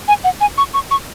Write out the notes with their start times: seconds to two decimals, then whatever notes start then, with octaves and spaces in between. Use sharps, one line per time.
0.08 G#5
0.24 F#5
0.41 G#5
0.58 C#6
0.74 C#6
0.91 C#6